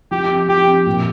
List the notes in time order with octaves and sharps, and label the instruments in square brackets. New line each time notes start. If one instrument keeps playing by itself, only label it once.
[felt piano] F3 [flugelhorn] G4
[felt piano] C4
[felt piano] F3 [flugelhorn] G4
[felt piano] C4
A#2